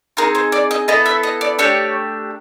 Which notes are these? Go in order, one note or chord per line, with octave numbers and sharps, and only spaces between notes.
C4 D#4 G#4 A#4
C5
D5
D#5
B3 E4 A4 D#5
E5
D#5
D5
A3 D4 G4 C#5